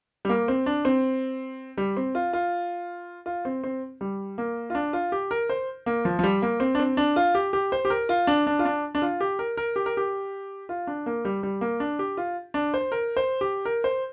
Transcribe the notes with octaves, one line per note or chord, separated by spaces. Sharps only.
G3
A#3
C4
D4
C4
G3
C4
F4
F4
F4
C4
C4
G3
A#3
F4
D4
F4
G4
A#4
C5
A#3
F3
F3
G3
A#3
C4
D4
C4
D4
F4
G4
G4
C5
G4
A#4
F4
D4
D4
F4
D4
D4
F4
G4
A#4
A#4
G4
A#4
G4
F4
D4
A#3
G3
G3
A#3
D4
G4
F4
D4
C5
A#4
C5
G4
A#4
C5